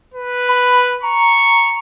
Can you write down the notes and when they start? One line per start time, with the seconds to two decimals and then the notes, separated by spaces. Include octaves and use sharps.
0.14 B4
0.49 B5
1.03 A#5 C#6